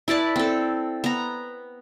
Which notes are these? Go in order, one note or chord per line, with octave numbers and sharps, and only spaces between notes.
E4 B4 D5 A5
C4 A4
B3 A#5